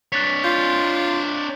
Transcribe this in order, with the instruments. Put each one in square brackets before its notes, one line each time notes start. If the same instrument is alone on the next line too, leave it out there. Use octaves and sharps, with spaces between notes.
[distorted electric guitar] D4 C#5 [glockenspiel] F#6 A6 B6
[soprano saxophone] F4 [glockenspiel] G6